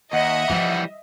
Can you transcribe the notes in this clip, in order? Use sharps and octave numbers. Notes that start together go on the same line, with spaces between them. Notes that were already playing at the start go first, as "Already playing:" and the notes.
D#2 D#5 E5 F#5
E3 F3 G3 E4